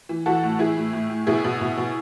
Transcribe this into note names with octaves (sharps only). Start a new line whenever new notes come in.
E3
E3 F#4 A4
A2
E3 E4 G#4
A2
A2
A2
B2 E4 G#4
B2
B2
B2